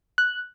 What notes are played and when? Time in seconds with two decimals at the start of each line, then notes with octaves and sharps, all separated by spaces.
0.18 F#6